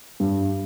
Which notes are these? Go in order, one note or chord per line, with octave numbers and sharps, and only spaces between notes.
G2